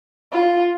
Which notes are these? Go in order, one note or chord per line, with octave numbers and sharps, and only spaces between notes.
F4